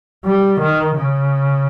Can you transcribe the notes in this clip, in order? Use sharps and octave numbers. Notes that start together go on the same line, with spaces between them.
G3
D#3
C#3